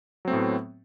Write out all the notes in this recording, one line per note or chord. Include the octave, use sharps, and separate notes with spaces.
A2 F#3 A3 B3 C4